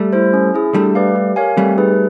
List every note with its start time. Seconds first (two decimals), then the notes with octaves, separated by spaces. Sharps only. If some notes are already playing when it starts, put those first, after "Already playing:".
Already playing: G3 A3
0.13 E4 A4 C5
0.33 C#4
0.54 E4 G#4
0.74 G3 A3 D4
0.95 G4 B4 D5 F5
1.15 G4
1.36 A#4 C#5 F5 G#5
1.57 G3 A3 C4
1.78 D#4 G#4 B4